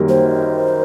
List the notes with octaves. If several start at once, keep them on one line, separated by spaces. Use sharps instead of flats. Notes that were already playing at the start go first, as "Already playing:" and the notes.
Already playing: F#2 D#3 G3 A#3
C5